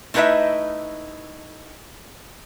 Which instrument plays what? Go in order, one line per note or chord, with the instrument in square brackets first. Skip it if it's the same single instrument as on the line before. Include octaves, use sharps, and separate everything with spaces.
[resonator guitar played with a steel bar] A3 D#4 E4 B4 D#5 E5